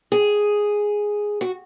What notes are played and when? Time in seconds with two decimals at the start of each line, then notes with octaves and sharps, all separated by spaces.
0.12 G#4
1.41 F#4